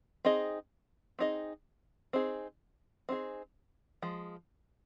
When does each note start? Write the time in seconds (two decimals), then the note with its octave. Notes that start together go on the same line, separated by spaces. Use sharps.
0.25 C4 D#4 G#4 D#5
1.19 C4 D#4 G#4 D#5
2.13 C4 D#4 G#4
3.09 C4 D#4 G#4
4.02 F3 G#3